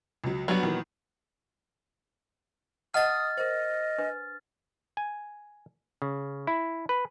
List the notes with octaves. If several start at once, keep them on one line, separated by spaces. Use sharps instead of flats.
C#2 F#3
F#3 G3 B3 D4 F#4
A#2 D#3 E3
D#5 F#5 A5 D#6 F6 A6
A#4 C5 D#5
D4 B4
G#5
C#3
E4
B4